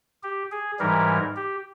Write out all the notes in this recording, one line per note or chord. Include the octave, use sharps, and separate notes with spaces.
G4
G#4
G#2 E3 G3 A#4
G4